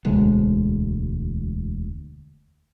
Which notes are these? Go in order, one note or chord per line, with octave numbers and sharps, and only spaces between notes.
E1 D2 G#3